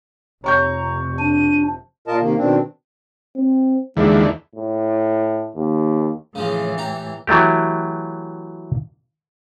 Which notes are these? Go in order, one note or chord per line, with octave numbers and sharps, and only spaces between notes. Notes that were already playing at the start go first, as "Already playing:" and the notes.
F1 C3 C#5 A#5 C#6 G6
D4 D#7
A#2 F4 A#4 D#5 A5
C3 D#3 A#3
B2 D#3 C4 D4
C4
D#2 D3 E3 G#3
A2
D#2
A2 C#3 E3 F3 G#3
G4 A#5
E3 F#3 A3 G4